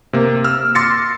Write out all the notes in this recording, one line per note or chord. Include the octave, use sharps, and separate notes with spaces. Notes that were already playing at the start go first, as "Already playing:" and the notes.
C3 A#3
E6 F6
C6 D6 A6 A#6 C#7